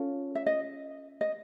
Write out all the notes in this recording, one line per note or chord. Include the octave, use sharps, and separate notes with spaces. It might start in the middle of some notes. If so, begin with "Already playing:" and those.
Already playing: C#4 F4 A4
E5
D#5
D#5